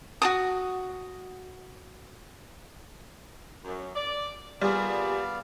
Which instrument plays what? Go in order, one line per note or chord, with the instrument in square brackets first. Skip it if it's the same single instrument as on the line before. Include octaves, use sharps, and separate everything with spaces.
[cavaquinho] F#4 A4 D#6
[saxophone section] F#2
D5
[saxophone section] A#2 G#4 [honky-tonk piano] G3 [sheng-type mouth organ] B3 D5 F5